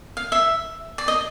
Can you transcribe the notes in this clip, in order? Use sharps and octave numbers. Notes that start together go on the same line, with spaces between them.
F5
E5
D5
D#5